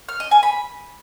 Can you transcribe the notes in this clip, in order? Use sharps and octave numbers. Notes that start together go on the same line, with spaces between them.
F6
D#5
G#5
B5